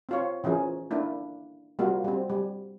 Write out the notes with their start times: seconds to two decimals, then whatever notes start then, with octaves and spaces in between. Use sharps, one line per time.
0.09 C4 F4 C#5
0.44 E3 F3 C#4 G#4 A#4
0.91 A#3 D4 E4
1.79 G3 A#3 C4 F4 F#4
2.04 G3 C4
2.30 G3